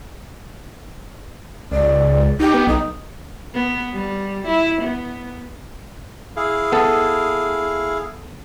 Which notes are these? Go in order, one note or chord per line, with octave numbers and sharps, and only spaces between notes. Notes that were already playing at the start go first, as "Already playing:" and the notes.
C#2 D5
D#4 G4
B3
B1 D#4
B3
G3
E4
B3
E4 G#4 F5
B3 A4